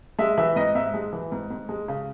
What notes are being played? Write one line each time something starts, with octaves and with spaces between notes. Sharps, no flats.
G#3 E5
E3 E5
G#2 D#5
G#2 E5
G#3
E3
G#2
G#2
G#3
C#3